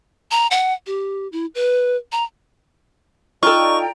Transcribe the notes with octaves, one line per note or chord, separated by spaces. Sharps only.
A#5
F#5
G4
E4
B4
A#5
D#4 F4 A4 D5 G5 A#5 C#6